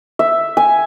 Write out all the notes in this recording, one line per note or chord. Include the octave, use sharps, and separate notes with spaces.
E5
G#5